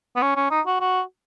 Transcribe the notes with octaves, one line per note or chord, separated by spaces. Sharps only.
B3
C#4
C#4
D#4
F#4
F#4